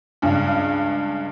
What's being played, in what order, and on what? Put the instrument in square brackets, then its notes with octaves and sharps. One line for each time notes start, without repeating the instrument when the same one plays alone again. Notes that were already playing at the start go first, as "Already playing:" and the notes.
[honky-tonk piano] C#2 G2